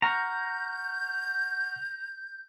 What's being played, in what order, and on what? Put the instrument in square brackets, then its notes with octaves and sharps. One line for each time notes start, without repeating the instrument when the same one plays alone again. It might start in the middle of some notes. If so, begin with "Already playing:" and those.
[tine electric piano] F#5 C#6 F6 [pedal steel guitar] A#5 [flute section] G6